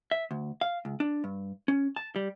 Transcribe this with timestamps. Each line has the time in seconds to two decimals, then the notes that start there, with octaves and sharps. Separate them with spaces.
0.11 E5
0.31 D2
0.61 F5
0.85 C#2
1.00 D4
1.24 G2
1.68 C#4
1.96 A5
2.16 G3